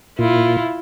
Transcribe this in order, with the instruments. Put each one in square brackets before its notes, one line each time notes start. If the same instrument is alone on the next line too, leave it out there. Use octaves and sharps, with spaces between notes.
[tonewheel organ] A#2 [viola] E4 F4